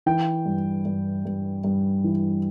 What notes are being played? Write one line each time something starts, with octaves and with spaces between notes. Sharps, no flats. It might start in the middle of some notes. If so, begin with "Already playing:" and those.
E3 G5
G2
G2
G2
G2
E3